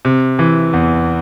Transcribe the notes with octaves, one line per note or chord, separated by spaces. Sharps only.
C3
E3
E2